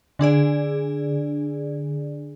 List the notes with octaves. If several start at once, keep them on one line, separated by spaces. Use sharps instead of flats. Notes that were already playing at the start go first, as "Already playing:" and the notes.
D3 D4 G#4 D5